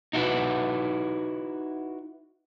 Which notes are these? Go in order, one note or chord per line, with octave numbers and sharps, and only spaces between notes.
D#4 E4 F#4 A4 B4